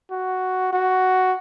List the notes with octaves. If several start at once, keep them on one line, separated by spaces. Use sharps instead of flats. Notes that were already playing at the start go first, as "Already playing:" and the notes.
F#4
F#4